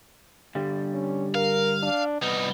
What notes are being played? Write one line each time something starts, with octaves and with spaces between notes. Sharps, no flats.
G2 D3 G3
C#4
A#4 F5
D4
C2 B3 D#4